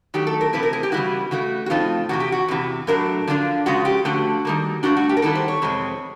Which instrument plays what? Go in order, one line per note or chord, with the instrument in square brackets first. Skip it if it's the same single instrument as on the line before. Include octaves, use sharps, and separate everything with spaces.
[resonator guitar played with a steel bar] D#3 F#3 A3 G4
A4
A#4
C3 E3 A3 C4 E4 B4
A#4
G#4
G4
C#3 E3 G3 B3 E4 F#4
C#3 E3 A3 F#4
F#4
A2 F3 A3 C4 D#4 F4
E2 C3 E3 F#4
G4
F#4
E2 C3 E3
A2 F#3 A3 D4 A#4
D3 F3 A3 D4 F4
C#3 F3 G#3 F#4
G4
D3 F3 A3 F#4
D#3 G3 A#3
G2 E3 A3 D4 F#4
F#4
G4
A#4
D#3 G3 B3 E4 A4
C5
C#5
F2 C3 E3 G#3 C4